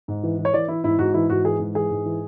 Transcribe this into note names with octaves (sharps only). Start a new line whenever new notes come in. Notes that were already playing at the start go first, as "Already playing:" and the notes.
G#2
E3
E3
C#5
E3 D5
E3 E4
G#2 E4
G#2 F#4
E3 E4
G#2 F#4
E3 G#4
G#2
E3 G#4
G#2
E3